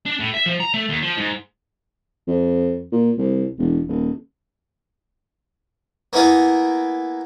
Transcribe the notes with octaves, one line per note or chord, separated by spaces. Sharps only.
D4
A2
E5
F3
A#5
A3
D#2
F3
G#2
F2
A#2
C2
E1
D#1
A#3 B3 E4 G#4 A#4